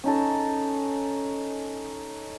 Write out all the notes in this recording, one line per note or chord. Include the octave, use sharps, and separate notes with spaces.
C#4 D#4 A4